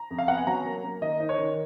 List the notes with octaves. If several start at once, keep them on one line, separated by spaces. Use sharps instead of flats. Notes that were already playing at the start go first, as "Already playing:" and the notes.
Already playing: A#5
F2
F5
B3 F#5
G#5
F#3 A#5
A#3
A#3
D#3 D#5
D#4
C#5
D#3